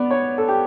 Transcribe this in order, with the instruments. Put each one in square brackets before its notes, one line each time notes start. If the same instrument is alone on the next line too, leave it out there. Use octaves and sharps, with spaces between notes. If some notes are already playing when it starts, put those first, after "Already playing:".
Already playing: [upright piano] B3 [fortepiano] D5
[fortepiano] C#5
A4
G4